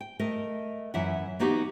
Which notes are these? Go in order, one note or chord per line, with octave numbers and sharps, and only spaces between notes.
G5
A3 A#4 D#5
F#2 E3 E5 F#5
A#3 B3 D#4 F#4 G4